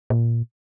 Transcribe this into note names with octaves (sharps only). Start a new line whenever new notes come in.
A#2